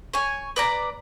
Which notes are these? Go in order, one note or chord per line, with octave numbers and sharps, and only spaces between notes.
C#5 G#5
B4 D5 A#5